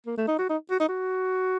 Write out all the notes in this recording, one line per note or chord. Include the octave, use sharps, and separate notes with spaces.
A#3
A3
D#4
F#4
D#4
F#4
D#4
F#4